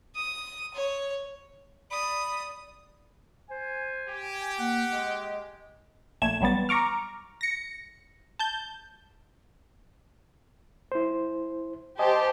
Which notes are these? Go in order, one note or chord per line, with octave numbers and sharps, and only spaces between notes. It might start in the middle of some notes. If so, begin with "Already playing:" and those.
D#6
C#5
D5 B5 D#6
C5 G#5
G4
A#3 F#5
G#3 D#5
A#1 A#2 A3 G#6 E7
A1 F#3 G3 B3 A6
A#5 C#6 D6 F6
A#6 C#7
A5 G6
E4 C5
G4 C5 D#5 G#5 A5